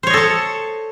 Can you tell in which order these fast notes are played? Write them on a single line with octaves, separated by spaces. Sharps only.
C5 C#5 D#5 A4 A5